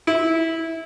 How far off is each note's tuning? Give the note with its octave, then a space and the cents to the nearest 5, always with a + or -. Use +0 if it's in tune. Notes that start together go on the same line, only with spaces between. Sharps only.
E4 -15